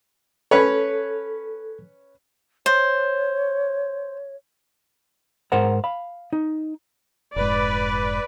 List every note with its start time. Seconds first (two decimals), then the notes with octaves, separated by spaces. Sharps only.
0.51 C#4 A4 B4 C#5
2.66 C5 C#5
5.52 G#2 A#4 C5 F#5 A#5
5.84 F5 B5
6.33 D#4
7.36 F1 G#2 B4 D5